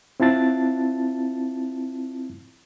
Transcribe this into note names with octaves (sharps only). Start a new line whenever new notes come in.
C4 E4 F4 A5 A6